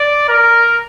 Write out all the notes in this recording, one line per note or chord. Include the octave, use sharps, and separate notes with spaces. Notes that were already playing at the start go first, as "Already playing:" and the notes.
Already playing: D5
A#4